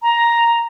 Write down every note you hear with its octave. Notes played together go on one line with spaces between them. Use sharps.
A#5